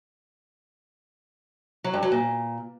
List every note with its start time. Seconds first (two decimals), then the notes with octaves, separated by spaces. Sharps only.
1.84 F#3
1.94 G2
2.03 F#3
2.12 A#2